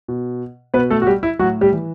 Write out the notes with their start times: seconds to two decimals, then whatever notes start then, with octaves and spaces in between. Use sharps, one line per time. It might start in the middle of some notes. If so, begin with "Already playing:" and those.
0.08 B2
0.74 B2 B3 B4
0.90 A3 A4
1.02 F#4
1.07 G3 G4
1.23 E4
1.39 A2 F#3 F#4
1.61 G3 G4
1.73 E3